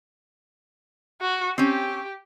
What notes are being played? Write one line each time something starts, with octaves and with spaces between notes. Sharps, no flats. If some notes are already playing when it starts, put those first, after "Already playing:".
F#4
C4 C#4 G4